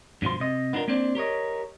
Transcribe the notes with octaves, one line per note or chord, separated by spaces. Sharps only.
G2 B2 F3 C6
C3 D#5
B3 D4 D#4 F4 A#4
A#3 C4 D4 C5 D5
G4 A#4 C#5 D#5